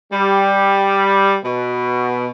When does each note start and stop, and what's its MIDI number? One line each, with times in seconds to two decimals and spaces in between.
0.12 1.37 55
1.44 2.28 47